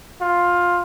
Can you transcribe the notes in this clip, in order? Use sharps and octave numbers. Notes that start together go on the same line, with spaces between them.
F4